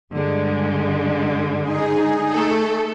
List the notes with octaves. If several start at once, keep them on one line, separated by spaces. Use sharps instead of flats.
G2 D3 G#3
D#4 G#4
A3 A4